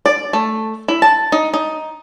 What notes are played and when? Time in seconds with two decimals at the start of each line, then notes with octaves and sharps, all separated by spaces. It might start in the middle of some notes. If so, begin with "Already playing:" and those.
0.06 D5
0.33 A3
0.88 E4
1.02 A5
1.32 D#4
1.54 D#4